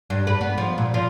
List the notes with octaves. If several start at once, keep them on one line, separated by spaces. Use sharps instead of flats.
G2
B4
B3
F3
A#2
F3